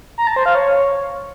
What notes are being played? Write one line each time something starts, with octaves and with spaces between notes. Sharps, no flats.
A#5
A5
C5
F5
C#5